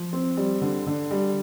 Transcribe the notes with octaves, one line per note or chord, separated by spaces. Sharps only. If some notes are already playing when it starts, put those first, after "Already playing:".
Already playing: F3
C4
G3
D3
D3
G3